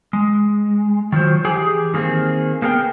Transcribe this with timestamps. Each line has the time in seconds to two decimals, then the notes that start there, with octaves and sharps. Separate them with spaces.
0.13 G#3
1.12 D#3 F3 F#3 C5
1.44 E3 G4 G#4 G#5
1.94 D#3 G#3 A#3 C4 G#4
2.62 A#3 B3 G#4 A#4 G5